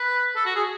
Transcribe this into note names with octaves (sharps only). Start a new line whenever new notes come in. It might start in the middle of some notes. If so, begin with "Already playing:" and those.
Already playing: B4
A4
F#4
G#4